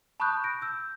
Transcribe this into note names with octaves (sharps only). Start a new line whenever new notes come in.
A5 B5 C#6 D#6 F#6 G6
A#6 D7
E6 G6